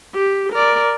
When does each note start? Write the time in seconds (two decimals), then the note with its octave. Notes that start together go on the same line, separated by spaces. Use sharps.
0.14 G4
0.53 A#4 D5